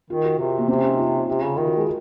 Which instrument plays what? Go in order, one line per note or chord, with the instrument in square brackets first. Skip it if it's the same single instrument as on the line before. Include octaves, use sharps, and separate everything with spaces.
[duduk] D#3 [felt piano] F4
[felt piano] F#4
[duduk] C3
[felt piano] A#3
[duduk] C3 [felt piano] C4
[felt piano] C#4
D#4
F4
[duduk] C3
C#3
[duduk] D#3 [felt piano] F4
[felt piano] F#4
G#3